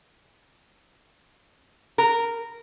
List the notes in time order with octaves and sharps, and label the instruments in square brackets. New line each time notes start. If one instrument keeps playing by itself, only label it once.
[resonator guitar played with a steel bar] A#4